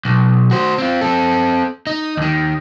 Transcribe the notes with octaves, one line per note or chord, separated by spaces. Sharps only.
B1
F#4 C5
C4 F4
C4 A4
D#4
D#2 D#3